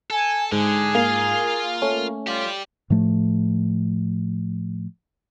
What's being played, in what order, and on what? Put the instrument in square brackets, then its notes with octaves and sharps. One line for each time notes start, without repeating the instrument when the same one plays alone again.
[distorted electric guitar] A4 [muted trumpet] G#5
[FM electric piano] G#2 [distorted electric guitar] D3 [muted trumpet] G#4
[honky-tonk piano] A#3 [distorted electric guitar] F4 F5
[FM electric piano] A3 C#4
[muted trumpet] F4 [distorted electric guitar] G4 D5
[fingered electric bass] A2 F3 A3